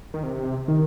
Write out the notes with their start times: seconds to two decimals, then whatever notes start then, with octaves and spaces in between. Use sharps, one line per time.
0.14 D#3
0.23 C3
0.68 D#3